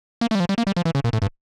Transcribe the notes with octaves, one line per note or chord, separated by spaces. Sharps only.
A#3
A3
G3
F3
G3
A#3
G3
F3
E3
C#3
A#2
A2
G2